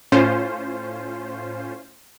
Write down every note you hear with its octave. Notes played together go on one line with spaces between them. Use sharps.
A2 C#4 F4 C5